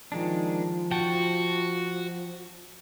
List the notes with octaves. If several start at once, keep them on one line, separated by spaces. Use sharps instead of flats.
D#3 F3 G#3 D4
F#4 G5 A5